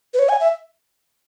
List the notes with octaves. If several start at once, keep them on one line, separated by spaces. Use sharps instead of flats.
B4
C#5
G#5
E5